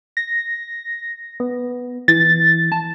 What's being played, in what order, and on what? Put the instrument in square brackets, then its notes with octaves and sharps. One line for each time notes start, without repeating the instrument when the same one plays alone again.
[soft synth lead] A#6
B3
[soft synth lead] E3 [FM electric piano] A6
[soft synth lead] A5